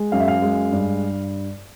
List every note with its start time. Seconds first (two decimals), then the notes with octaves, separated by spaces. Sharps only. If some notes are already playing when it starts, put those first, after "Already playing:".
Already playing: G#3
0.12 F#2 F5
0.20 E5
0.28 F5
0.42 G#3
0.72 G2